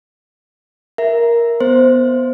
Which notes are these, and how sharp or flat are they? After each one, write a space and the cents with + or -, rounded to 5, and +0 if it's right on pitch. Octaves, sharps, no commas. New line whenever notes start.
A#4 +10 E5 +0
B3 +0 C5 -5